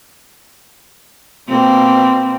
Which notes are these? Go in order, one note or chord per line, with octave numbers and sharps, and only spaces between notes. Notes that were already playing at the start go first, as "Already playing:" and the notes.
B2 A#3 C4